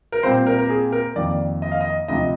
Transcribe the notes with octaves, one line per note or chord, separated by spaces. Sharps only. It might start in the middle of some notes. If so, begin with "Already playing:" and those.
A#4
A#2 G3 C4 C5
A#4
A#4
G#4
A#4
F2 D#3 A#3 D5
D#5
F5
D#5
D2 C3 F3 D#5